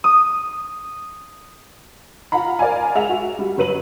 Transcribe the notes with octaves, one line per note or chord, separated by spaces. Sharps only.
D#6
F4 F5 F#5 A#5 B5
A#4 D5 F5 G#5
G#3 E5 F#5 F7
F#4
G3
G1 F#3 B4 D#7 F#7